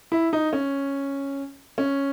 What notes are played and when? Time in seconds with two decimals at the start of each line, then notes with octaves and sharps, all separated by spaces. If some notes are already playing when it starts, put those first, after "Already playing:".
0.12 E4
0.33 D#4
0.53 C#4
1.78 C#4